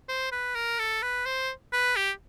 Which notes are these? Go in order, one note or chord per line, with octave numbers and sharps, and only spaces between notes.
C5
B4
A#4
A4
B4
C5
B4
G4